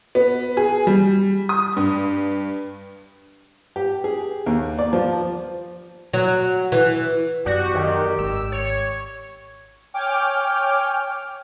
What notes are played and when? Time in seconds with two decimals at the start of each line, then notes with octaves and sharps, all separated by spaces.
0.15 B3
0.57 G#4
0.87 G3
1.49 D#6
1.77 G2
3.76 G4
4.04 G#4
4.46 D#2
4.79 D5
4.93 F3
6.13 F#3
6.72 E3
7.46 F#2 F#3 B3 F#4 G4 D5
7.75 D#3
8.19 G#1 G#2 G#3 E6
8.52 C#5
9.94 C#5 G5 G#5 D6 F6